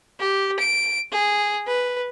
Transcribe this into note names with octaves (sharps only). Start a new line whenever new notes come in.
G4
D7
G#4
B4